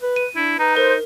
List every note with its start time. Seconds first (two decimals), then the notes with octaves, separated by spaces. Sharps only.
0.02 B4
0.16 D#7
0.35 D4 E4
0.59 D#4 B4 A#5
0.77 A#4 C5